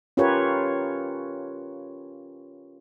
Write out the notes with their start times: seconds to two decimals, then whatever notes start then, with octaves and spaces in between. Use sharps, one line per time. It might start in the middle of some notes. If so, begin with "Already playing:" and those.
0.17 C#4 F4 G4 A#4 B4 C#5